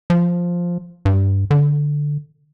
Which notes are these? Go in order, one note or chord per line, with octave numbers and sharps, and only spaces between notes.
F3
G2
D3